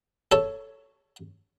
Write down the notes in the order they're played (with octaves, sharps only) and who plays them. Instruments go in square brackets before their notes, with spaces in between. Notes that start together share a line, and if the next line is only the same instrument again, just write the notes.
[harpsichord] A4 C#5